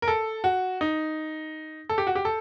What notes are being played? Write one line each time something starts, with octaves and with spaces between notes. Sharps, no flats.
A#4
A4
F#4
D#4
A4
G4
F#4
G4
A4